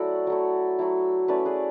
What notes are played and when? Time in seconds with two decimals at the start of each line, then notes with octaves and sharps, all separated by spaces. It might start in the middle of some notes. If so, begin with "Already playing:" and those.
Already playing: F#3 A3 E4 F#4 A4 D5 F#5
0.27 F#3 A3 E4
0.79 F#3 A3 E4
1.28 A3 C#4 E4 B4 D5
1.45 G#4 B4